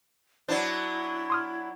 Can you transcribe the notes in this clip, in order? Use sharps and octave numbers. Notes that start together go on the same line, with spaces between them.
F#3 B3 D4 E4 C5 D5
C6 D#6 F6